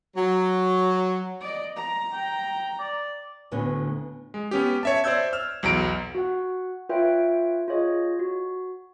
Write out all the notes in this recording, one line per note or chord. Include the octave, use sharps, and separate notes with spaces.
F#3
D5 D#5
A#5
G5
D5
D2 A2 D3 B3 C#4
G#3
B3 C#4 G4
C#5 E5 A5
C5 D5 E5 E6 G6 G#6
E6 F6
B1 E2 F#3 A#5 D7
F#4 F#5
F4 B4 C#5 E5 G5
F4 G#4 C#5 D#5
F#4